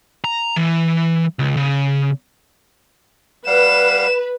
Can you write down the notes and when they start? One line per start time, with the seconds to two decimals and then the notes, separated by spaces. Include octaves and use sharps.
0.24 A#5
0.56 E3
1.39 C#2
1.57 C#3
3.47 G3 B4 F5 F#5 E7